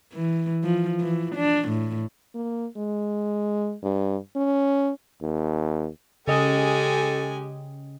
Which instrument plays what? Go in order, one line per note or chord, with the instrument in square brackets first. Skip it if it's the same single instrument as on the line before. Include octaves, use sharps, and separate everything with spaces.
[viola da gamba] E3
F3
E3
D4
A2
[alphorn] A#3
G#3
G2
C#4
[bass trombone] D#2
[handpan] C#3 D#5 [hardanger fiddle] G#3 G#5 [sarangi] G4 [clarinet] A4